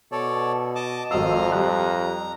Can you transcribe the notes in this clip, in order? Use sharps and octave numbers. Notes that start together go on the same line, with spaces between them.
B2 A4 C#5 D5
D#5 A5 D6
G#1 F2 D#5 F5 A#5 E6
G3 A#5 F#6